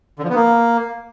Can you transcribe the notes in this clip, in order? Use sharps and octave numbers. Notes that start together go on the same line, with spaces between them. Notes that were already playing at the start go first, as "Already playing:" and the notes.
D3
F3
B3
A#3